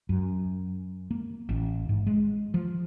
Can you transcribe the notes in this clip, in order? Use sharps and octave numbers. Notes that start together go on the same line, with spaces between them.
F#2
A#3
A1
G#2
G#3
F3